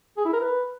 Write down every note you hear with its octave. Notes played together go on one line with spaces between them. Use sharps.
G#4
E4
A#4
B4